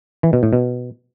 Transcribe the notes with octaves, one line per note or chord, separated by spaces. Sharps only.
E3
B2
A2
B2